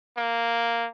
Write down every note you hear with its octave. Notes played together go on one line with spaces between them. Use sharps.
A#3